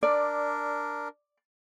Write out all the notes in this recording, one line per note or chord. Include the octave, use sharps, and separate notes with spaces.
D4 A#4 D5